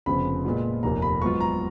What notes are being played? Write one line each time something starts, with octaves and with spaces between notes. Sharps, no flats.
F1 F2 C#3 F3 B3 B5
A#2 G#3 B3 F4
F1 D#2 D#3 A#3 A#5
B5
G#2 F#3 B3 F4 C#6
A#5